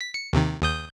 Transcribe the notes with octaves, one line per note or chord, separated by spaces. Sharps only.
B6
C#7
D#2 C3 D#3
D#2 D#6 G6